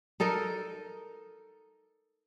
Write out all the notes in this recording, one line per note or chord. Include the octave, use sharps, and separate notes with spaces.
D#4 A4 A#4 D#5